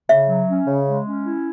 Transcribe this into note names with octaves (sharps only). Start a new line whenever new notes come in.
C#3 E5
F#3
C#4
C#3
G#3
C#4
E4